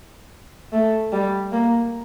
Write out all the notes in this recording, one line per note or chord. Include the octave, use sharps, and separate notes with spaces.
A3
G3
A#3